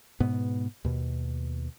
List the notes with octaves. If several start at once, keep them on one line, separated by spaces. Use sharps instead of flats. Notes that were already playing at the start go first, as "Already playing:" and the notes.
G#2 B2 B3
D#2 B2